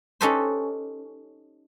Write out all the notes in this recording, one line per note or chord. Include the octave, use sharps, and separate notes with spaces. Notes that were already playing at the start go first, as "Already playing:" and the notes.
C#4 D#4 G4 A4 B4 C5